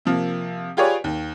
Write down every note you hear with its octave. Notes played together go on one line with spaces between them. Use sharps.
C3 F3 A#3
F4 G4 G#4 B4 C#5 D5
D#2